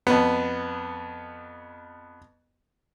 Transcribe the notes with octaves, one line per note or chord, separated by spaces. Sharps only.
F2 B3